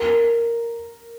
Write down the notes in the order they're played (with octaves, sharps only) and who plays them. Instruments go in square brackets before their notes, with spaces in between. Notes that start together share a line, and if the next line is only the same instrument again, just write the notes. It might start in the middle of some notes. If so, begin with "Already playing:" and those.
Already playing: [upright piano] A#4